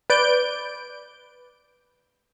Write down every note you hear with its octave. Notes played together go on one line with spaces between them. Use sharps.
B4 D5 G6 D7